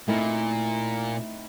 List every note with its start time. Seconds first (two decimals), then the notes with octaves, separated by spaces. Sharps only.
0.08 A#2 A3 C4 D#4 E4